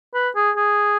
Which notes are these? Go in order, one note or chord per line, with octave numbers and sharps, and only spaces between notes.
B4
G#4
G#4